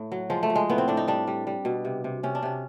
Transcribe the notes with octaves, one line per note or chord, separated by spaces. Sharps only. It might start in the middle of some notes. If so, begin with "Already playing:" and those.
Already playing: A2
F#3
F3 G#3
A3
F3
G#3
A2 B3
C4
A2 D4
D#4
G3 D4
G3
G3
B2
C3
C3
C3 C#4
D4
C3 C#4